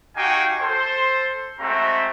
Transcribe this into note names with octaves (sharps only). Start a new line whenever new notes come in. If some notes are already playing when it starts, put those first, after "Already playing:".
D#4 F#4 G4 F5 G5 G#5
A4 C5 C6
G#3 A3 C4 F#4 E5 A#5